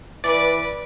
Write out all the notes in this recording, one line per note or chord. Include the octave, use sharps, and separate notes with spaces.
E3 B4 D5 D6